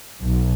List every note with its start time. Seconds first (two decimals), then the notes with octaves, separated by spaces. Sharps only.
0.23 B1